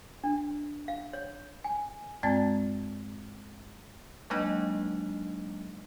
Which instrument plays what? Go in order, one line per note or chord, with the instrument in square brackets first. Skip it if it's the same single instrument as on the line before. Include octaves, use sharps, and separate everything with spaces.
[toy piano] D4
F5
C#5
G#5
[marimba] G2 G#3 C4 D5 A5 A6
[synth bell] F#3 G#3 A#3 D4 D#4 D#5